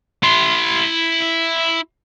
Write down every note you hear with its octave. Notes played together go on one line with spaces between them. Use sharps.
E4 C6